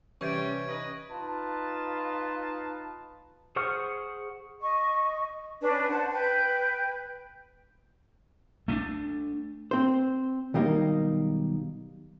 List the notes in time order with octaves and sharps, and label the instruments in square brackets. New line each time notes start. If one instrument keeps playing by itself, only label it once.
[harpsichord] C3 E3 [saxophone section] G3 [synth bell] C#4 [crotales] C#6 G#6 D7
[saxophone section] B4 D#5
[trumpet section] D#4 F4 B4 A5
[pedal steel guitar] G#4 C5 F#5 C#6 F6
[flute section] D#5 C#6
C#4 D4 B4
C5 F#5 A5
B4 G5 G6
[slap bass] A3 C4 D4
[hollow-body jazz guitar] C4 C5
B1 D#3 G3 A#3 D#4